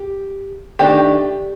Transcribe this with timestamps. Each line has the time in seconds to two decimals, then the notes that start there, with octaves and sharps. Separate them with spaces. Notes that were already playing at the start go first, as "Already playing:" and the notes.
Already playing: G4
0.79 D#3 A3 D4 G4